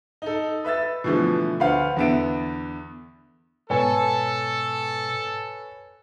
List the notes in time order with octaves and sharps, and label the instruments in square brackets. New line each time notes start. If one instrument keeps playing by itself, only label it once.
[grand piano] D#4 A4
B4 E5 E6 A6
B2 D3 E3 F3 A3
D2 B4 C5 F5 F#5
E2 D3 B3 E5 D7
[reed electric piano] G#2 B2 [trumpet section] A4 [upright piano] B4 C#5 G#5